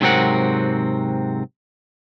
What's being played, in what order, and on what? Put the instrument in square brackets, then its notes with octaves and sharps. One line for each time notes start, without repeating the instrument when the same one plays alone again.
[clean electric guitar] G#2 C3 F#3 C4 A#4 F#5